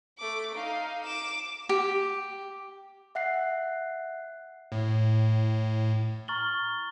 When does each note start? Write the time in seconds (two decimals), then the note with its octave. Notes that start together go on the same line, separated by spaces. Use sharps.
0.18 A3 D6
0.55 D#4 F5
1.06 D6 E7
1.69 G4
3.15 E5 F#5 F#6 C7
4.72 A2
6.28 A#5 C#6 F6 A6 F#7 G7